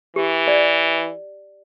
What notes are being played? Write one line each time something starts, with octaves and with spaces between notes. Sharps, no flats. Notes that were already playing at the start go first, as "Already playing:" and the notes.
E3 G4
D5